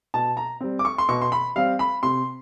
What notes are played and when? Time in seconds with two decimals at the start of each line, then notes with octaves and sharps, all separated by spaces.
0.14 B2 A5
0.37 A#5
0.61 G3 C4
0.79 D6
0.85 C#6
0.98 C6
1.09 B2 C#6
1.22 C6
1.32 B5
1.56 G3 C4 F5
1.79 B5
2.03 C3 C6